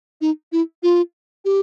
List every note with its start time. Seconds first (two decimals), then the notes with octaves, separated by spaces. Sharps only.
0.21 D#4
0.52 E4
0.83 F4
1.45 G4